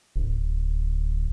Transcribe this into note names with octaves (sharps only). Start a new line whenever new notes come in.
D1